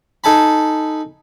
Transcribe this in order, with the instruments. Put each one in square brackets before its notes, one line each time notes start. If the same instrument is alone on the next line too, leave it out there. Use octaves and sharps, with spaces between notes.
[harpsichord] D#4 A4 G#5 A5 B5